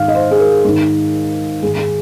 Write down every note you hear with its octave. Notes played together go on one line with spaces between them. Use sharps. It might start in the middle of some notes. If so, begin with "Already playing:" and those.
Already playing: G#2 D#3 F5
D#5
C5
G#4
A#4
G#2 D#3
G#2 D#3 G#4
G#4